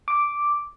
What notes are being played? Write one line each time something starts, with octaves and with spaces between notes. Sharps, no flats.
D6